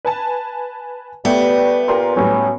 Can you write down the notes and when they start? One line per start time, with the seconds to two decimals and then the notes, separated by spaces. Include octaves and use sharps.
0.05 B4 G#5 A5
1.25 G3 A3 B3 G4
1.88 A#2 G4 A#4 C6
2.16 A2 F#3 G3 C#4